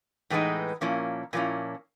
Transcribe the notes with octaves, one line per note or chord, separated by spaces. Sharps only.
A2 E3 G#3 B3 D#4
A#2 F3 A#3 C#4 E4
A#2 F3 A#3 C#4 E4